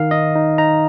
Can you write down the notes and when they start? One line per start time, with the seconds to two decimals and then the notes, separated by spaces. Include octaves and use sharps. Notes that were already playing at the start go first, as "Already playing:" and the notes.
Already playing: D#3 F5
0.11 D#4 D#5
0.36 D#4
0.58 D#4 A#5